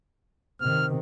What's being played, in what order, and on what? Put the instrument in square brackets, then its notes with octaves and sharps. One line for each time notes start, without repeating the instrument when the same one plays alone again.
[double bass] C3 D#3 [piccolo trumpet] F6